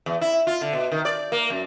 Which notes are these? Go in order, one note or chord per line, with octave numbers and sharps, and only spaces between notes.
E2
E4
F4
D3
B2
D#3
D5
A#3
F#2